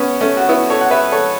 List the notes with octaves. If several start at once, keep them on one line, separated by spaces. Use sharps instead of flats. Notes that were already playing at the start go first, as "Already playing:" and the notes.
Already playing: B3 C#4
A3 C#4
F#4
B3 E4
A4 C#5
F#5
B4 E5
A4 C#5